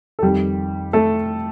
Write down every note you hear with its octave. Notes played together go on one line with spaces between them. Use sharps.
A4
F2 D#3 G3 G4
A3 A4